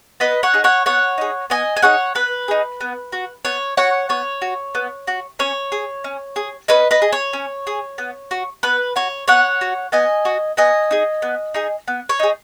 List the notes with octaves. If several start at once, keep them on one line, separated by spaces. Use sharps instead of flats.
B3 B4 D#5
C#5 F#5
D#4 G#4
C#5 F#5
B3 C#5 F#5
D#4 G#4
B3 D#5 G#5
G#5
D#4 G#4 C#5 F#5
B3 B4
D#4 G#4
B3
F#4
B3 C#5
F#4 C#5 F#5
B3 C#5
F#4
B3
F#4
C#4 C#5
G#4
C#4
G#4
C#4 B4 D#5
B4 D#5
G#4
C#5
C#4
G#4
B3
F#4
B3 B4
F#4 C#5
B3 C#5 F#5
F#4
B3 D#5 G#5
F#4
B3 D#5 G#5
D#4 G#4
B3
D#4 G#4
B3
C#5
D#4 G#4